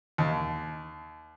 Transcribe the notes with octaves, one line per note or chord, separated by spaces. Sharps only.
D#2